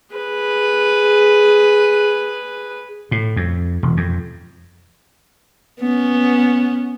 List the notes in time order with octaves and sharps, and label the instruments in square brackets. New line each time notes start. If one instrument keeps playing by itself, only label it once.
[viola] G#4 B4
[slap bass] A2
F2
E1
F2
[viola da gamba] B3 C#4